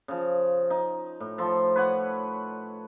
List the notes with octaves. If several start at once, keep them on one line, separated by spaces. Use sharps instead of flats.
C#3 F3
D#4
A2
F3 A4 C6
B4 C#5 F#5